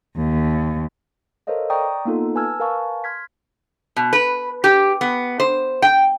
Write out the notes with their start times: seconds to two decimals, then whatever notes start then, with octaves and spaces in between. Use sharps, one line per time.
0.15 D#2
1.47 A4 A#4 C5 C#5 D#5 F5
1.70 D5 G5 A#5 C#6 D#6
2.05 A#3 B3 D#4 F4 A4
2.35 B4 G#5 A5 E6 F6 G#6
2.60 A#4 B4 F5 G#5 A5 C#6
3.04 C6 F6 G#6 B6
3.96 B2
4.13 B4
4.64 G4
5.01 B3
5.40 C5
5.82 G5